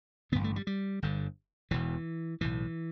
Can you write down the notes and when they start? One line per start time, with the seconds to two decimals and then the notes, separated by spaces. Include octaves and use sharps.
0.32 A1 G2 D3 B3
0.44 A3
0.56 G3
0.67 G3
1.02 G1 G2 D3
1.71 E1 E2 B2 E3
2.41 B1 A2 E3